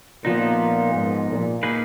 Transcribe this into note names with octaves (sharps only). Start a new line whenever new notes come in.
A#2 F3 B3 D#4
G#2
A#2
A#3 D#4 G#4 B4